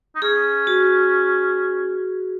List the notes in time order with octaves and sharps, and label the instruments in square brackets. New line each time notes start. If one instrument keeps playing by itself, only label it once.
[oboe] D#4
[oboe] C#4 [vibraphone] G#4
[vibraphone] F#4